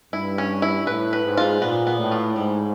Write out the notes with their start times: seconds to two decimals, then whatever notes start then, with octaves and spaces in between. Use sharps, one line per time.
0.13 G2 E4
0.38 C#4
0.62 E4
0.87 A2 B4
1.13 B4
1.25 G#2
1.37 F4
1.62 A#2 B3
1.87 B3
1.99 A2
2.11 F4
2.36 G#2 G3